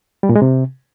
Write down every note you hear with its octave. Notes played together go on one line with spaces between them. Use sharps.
G3
A#2
G#3
C3